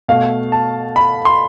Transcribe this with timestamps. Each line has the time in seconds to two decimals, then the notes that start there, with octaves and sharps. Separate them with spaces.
0.08 B2 A3 F5
0.52 A5
0.96 B5
1.25 C6